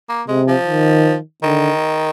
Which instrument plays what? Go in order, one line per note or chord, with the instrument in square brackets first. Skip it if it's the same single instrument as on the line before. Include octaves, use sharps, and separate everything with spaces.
[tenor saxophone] A#3
[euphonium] C3 [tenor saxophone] G#3
[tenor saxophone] F3
[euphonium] D#3
[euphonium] D3 [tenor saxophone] D#3